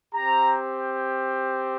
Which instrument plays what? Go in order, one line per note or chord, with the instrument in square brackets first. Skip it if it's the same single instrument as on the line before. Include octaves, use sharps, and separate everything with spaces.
[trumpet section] C4 G4 A#5